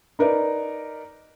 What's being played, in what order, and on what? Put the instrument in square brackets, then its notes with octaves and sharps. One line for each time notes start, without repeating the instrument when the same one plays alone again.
[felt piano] D#4 A#4 B4 D5